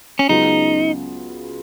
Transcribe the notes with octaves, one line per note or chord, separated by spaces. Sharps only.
C#4
C#2 C#3 F#3 B3 D#4 F4